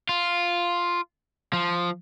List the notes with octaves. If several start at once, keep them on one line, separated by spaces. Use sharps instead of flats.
F4
F3